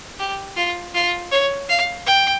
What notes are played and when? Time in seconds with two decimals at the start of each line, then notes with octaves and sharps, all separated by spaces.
0.19 G4
0.57 F4
0.95 F4
1.31 C#5
1.69 F5
2.06 G5